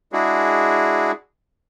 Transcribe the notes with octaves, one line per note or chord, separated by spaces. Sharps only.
G#3 D4 E4 F#4 G#4